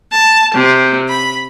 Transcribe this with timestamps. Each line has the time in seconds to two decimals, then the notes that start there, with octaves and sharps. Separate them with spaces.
0.11 A5
0.54 C3
1.08 B5